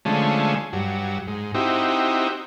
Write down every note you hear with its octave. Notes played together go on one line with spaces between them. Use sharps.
D3 F3 G#3 A3 C#4
G2 F#3
G#2
C4 D#4 E4 F#4 G4